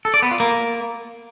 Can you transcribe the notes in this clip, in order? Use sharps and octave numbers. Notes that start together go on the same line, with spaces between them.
A4
D5
B3
F4
A#3